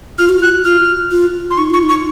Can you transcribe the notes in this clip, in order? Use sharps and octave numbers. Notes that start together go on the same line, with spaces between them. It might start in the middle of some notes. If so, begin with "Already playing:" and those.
F4 F6
F#4
F4 F#6
F4 F6
F4
C6
D#4 C#6
F4 C#6
D#4
C#6